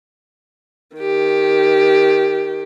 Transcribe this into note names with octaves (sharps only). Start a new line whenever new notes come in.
D#3 G4